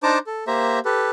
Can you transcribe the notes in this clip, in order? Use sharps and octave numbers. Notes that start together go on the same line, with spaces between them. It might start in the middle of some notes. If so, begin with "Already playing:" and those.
D4 D#4 C5 A5 A#5 D6
A4
A#3 G4 C5 E5 A#5
G4 A4 B4